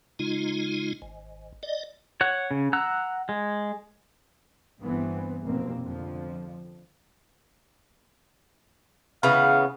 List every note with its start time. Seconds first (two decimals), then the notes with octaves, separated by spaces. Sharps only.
0.19 C#3 G#3 D#4 F4
1.02 G#1
1.63 D5 D#5
2.21 C#5 F#5
2.51 C#3
2.73 F#5 A#5 E6 F#6
3.29 G#3
4.80 G1 G2 E3 B3 C4
5.42 F1 B2 A#3 C4
5.83 F2 D3 F3
9.23 C#3 E3 B3 F5